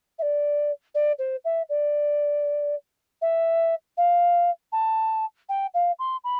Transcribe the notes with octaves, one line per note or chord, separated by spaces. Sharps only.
E5
D5
D5
C5
E5
D5
E5
F5
A5
G5
F5
C6
B5